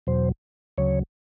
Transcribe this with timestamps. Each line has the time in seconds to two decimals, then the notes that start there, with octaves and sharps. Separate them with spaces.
0.07 E2 B2 F#3 C5
0.78 D2 C#3 F#3 C#5